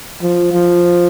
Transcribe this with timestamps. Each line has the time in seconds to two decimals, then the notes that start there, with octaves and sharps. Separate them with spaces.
0.22 F3
0.52 F3